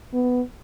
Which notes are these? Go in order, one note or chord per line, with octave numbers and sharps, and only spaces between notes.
B3